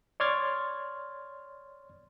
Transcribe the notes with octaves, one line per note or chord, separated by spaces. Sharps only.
C#5 D5 C6 F6 G#6 A6